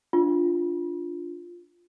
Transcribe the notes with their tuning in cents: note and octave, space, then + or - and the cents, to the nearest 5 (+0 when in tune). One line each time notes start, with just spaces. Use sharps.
D4 +0 F4 +0